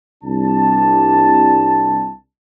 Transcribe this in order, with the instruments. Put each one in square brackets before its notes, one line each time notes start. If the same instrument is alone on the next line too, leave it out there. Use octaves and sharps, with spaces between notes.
[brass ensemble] C2 D4 A5